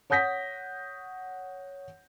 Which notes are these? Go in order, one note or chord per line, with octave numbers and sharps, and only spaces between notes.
C#5 F#5 D#6 G6 A#6 B6